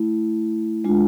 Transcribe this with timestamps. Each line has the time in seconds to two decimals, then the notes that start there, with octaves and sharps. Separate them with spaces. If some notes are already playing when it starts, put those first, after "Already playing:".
Already playing: A3 E4
0.84 G#3 D4 F4